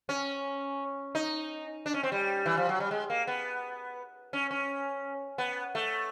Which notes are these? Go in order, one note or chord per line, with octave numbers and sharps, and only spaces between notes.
C#4
D#4
D4
C#4
C4
G3
E3
F3
F#3
G3
G#3
A#3
B3
C#4
C#4
B3
A3